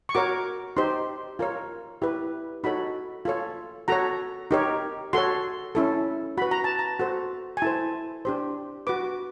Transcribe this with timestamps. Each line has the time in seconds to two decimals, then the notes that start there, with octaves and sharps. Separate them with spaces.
0.09 C#6
0.15 F#4 A#4 C#5 D6
0.77 D#4 G4 C5 C6
1.39 F4 A#4 C#5
2.02 E4 G4 B4
2.64 D#4 F#4 A4 C#5 B5
3.25 F4 A4 C#5
3.88 F#4 A4 C#5 A#5
4.51 D#4 G4 A#4 C#5
5.13 F#4 A4 C#5 C6
5.75 C#4 E4 A4
6.38 F#4 B4 B5
6.51 A#5
6.64 A5
6.79 A#5
6.99 F#4 A4 C5
7.57 G#5
7.62 E4 A4 C5 A5
8.25 D4 G4 C5
8.87 F#4 B4 D6